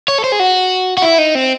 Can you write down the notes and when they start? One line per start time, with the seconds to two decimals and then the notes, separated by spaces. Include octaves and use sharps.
0.08 C#5
0.18 A4
0.24 C5
0.32 G#4
0.40 F#4
0.97 F#4
1.02 E4
1.18 D#4
1.35 C4